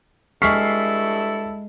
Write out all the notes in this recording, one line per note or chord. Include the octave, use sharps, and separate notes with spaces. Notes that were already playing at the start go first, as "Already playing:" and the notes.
G2 G#3 E4 A4 C#6 F6 B6 C7